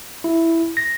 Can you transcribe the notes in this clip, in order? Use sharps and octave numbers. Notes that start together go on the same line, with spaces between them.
E4
A#6